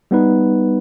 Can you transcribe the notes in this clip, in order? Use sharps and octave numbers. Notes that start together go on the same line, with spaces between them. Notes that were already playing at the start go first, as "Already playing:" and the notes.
G3 B3 D#4 B4